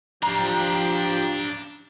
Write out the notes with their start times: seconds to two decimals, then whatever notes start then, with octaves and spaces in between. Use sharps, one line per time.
0.23 F3 D4 G4 F5 G5 A#5